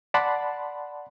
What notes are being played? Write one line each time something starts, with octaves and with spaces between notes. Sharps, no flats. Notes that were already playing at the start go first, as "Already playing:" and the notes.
D5 F#5 A5 B5 C6